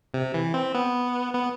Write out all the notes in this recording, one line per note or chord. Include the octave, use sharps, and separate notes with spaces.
C3
E3
C4
B3
B3